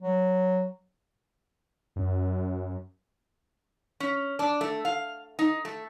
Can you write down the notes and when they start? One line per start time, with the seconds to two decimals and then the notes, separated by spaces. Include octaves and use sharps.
0.02 F#3
1.96 F#2
4.00 C#4
4.39 D4
4.61 A3
4.85 F5
5.39 D#4
5.65 A3